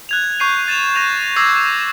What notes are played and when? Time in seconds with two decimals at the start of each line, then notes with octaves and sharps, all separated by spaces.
0.09 F#6 G#6 F7
0.40 C#6 G6 C7 D#7 F7
0.68 A6 E7 F7
0.95 G6 A#6 D#7 F7
1.36 D6 E6 G#6 A#6 C7